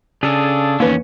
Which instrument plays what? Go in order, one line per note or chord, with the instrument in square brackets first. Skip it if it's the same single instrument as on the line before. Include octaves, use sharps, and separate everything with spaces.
[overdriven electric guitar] C#3 [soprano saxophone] D4 [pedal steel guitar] G#4 A4
[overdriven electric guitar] E2 D#3 [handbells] A#3 B4 [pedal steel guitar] C#4